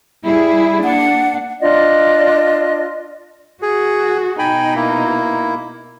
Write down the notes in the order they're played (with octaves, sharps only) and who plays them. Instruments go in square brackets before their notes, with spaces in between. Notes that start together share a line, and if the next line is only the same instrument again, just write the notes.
[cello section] G3 E4 G#4
[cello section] A#3 D4 [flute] F#5
[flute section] D4 F4 D5 D#5
[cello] F#4 [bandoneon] G#4
[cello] B2 D#4 [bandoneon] G5 G#5 B5
[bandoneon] A#3 E4